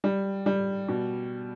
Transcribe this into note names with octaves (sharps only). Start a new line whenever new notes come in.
G3
G3
B2